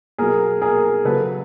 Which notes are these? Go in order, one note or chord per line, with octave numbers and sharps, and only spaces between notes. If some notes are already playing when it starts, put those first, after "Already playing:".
B2 F#3 G#4 A#4
G#4 A#4
C#3 F#3 A4 B4